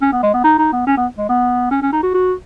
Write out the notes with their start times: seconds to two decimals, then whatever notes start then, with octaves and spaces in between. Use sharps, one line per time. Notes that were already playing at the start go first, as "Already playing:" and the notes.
0.02 C#4
0.12 B3
0.23 G#3
0.34 B3
0.44 D#4
0.59 D#4
0.72 B3
0.87 C#4
0.97 B3
1.18 G#3
1.29 B3
1.71 C#4
1.82 C#4
1.92 D#4
2.03 F#4
2.14 F#4